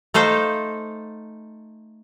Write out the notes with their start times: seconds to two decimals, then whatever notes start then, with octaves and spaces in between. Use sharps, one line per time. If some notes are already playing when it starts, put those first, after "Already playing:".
0.14 A3 D#4 A4 C5 F5